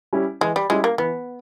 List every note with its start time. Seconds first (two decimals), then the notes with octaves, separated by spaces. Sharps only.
0.13 G3 C#4 E4 G4
0.41 E3 G#3
0.56 G3
0.70 G3 G#3 C#4 E4 G4
0.84 A#3
0.98 E3 B3